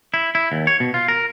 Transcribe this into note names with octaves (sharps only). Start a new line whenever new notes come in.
E4
E4
D#2
C#5
B2
F4
A#4